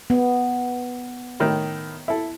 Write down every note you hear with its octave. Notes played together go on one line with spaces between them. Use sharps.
B3
A2 D#3
E4 A4